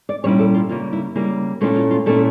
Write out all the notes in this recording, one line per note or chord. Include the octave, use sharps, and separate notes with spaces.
D5
A#2 G3 C#4 E4 C#5
A4
F4
C#3 G3 A#3 F4
E4
C#3 G3 A#3 E4
A#2 A3 C#4 E4 F4
F4
F4
A#2 A3 C#4 E4 A4